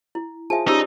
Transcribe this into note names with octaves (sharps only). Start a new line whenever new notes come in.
E4
F4 G#4 C5 E5 G#5 A5
C#4 D#4 G4 C5 D5 E6